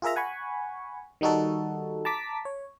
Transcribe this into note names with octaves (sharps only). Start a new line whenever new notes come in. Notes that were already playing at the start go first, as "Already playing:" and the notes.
F4 G#4 A#4 E5 A#5
F#5 G#5 B5 C#6
D#3 G3 D#4 F#4 A4
A5 A#5 D6 B6
C#5